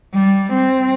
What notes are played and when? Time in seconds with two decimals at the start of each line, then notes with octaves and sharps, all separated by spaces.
0.13 G3
0.53 C4